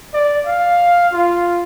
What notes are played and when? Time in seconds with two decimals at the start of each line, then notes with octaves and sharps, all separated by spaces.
0.14 D5
0.46 F5
1.13 F4